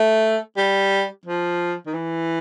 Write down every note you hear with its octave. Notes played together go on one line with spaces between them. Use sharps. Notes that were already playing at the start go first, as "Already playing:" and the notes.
Already playing: A3
G3
F3
D#3
E3